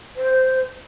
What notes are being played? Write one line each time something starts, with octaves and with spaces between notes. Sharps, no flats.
C5